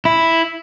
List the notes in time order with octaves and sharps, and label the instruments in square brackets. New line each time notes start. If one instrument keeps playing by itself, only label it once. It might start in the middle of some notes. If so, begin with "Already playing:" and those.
[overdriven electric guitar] E4